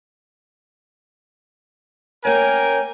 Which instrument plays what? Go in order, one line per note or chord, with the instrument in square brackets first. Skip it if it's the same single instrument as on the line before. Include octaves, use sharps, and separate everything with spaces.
[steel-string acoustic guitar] A#3 C#4 [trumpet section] A#4 G5 G#5